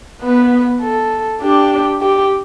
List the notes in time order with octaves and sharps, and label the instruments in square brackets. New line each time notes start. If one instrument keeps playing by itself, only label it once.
[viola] B3 [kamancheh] B4
[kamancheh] A4
[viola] D4 [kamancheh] G4
[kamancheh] G4